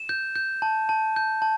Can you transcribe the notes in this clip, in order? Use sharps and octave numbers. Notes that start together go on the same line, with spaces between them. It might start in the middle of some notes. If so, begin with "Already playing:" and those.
Already playing: E7
G6
G6
A5
A5
G6
A5